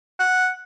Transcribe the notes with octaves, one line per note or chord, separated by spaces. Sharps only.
F#5